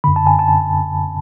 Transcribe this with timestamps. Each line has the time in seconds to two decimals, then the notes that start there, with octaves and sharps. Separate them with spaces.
0.04 F#2 D3 B5
0.16 A5
0.27 G#5
0.39 A5